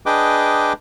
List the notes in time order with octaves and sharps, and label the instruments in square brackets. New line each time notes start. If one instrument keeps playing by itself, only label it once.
[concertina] D4 G#4 B4 D#5 G5 D6